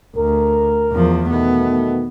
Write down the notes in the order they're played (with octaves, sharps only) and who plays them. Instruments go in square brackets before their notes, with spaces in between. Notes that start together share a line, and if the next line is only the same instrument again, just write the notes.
[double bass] D2 [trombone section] A#4
[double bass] E2 F3
[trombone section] B2 D#3 A3 [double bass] B3